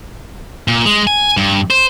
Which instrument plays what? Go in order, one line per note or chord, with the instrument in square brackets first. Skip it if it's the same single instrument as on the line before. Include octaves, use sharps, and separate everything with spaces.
[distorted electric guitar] A#2
G#3
G#5
G2
C5